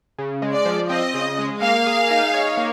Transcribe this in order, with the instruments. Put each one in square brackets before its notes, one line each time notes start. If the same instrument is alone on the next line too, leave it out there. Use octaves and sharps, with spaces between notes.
[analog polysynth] C#3
G#3
[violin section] D5
[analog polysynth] F3
[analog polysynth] C4 [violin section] D#5
[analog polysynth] C#3
G#3
[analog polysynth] A#3 [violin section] F5
[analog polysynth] G#4
D#4
C#5
A#3